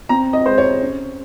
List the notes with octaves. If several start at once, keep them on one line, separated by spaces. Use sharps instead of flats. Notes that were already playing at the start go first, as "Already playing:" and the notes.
C4 A#5
D#5
G#3 C5
C#5
C#4